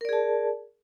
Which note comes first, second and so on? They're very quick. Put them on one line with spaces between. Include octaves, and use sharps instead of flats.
A#4 D5 G#4 A5